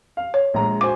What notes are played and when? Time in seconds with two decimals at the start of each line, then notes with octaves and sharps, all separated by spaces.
0.17 F5
0.34 C#5
0.54 A#1 G#3 A#5
0.81 F#4 C5 G#5 D6